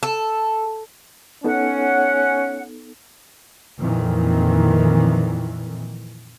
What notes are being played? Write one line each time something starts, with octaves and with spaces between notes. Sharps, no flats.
A4
B3 C#4 D#4 A4 F#5
F2 A#2 D#3 E3